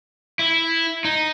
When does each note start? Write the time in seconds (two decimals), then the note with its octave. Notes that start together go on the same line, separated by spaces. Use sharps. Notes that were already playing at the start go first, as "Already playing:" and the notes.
0.39 E4
1.05 D#4